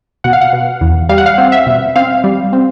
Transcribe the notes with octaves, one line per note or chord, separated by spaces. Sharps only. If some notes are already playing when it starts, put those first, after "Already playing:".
B2 F#5
F5
F#5
B2
E2
G3 F5
F#5
F5
C4
E5
B2
C4 F5
G3
C4